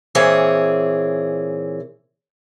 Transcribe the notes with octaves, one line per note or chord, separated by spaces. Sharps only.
A#2 E3 C4 G#4 C#5